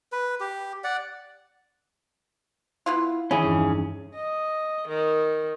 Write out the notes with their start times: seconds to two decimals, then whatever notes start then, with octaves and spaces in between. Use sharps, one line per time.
0.12 B4
0.40 G4
0.84 D5 F#5
2.86 B3 E4 F4
3.31 D#3 E3 C#4 E4 G#4
3.43 E1 G2
4.15 D#5
4.89 D#3